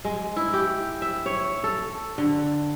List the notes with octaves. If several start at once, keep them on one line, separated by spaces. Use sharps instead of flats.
G#3
E4
G4
E5
C#5
A4
D3